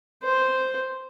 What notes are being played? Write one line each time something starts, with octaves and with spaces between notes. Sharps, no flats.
C5